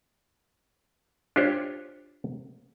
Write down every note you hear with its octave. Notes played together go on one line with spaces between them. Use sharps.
D4 F4 G4 C5 C#5